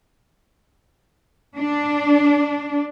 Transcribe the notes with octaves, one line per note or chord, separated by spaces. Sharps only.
D4